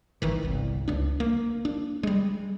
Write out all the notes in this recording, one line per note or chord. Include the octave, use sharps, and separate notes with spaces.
G#1 D#3 E3
G1 C2
C#2 D4
A#3
D4
G3 G#3